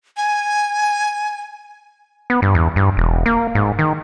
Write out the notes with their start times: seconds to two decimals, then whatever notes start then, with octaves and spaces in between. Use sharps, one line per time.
0.17 G#5
2.30 B3
2.42 G2
2.55 E2
2.76 G2
2.97 E1
3.26 A#3
3.55 G#2
3.79 D#3